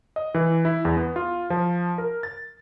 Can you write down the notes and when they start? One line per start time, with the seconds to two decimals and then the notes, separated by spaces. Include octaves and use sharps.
0.16 D#5
0.34 E3
0.65 E4
0.85 E2
0.96 B3
1.16 F4
1.50 F3
1.98 A#4
2.23 A6